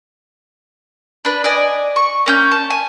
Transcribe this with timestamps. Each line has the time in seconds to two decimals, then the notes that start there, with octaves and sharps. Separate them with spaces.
1.25 D4 B4
1.44 D5 D#5 G#5
1.96 C#6
2.26 A#3 C#4 G6
2.51 A5
2.70 G#5